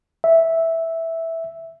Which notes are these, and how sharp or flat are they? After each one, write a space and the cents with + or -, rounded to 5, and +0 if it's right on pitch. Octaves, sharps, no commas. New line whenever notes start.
E5 -5